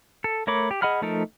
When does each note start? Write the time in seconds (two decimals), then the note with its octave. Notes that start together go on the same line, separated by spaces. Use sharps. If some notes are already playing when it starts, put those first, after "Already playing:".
0.24 A4
0.47 A3 A#4 C#5 B5 D6
0.71 G4
0.82 G#4 D#5 F#5 B5 F6
1.02 F3 A3 D#4 A4 A#4